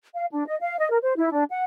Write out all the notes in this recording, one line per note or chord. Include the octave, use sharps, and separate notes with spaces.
F5
D4
D#5
F5
D#5
A#4
C5
E4
D4
F#5